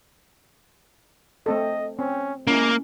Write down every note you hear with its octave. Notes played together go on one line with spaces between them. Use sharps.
A3 C4 A4 D#5
C4 C#4
G#3 A#3 C#4 E4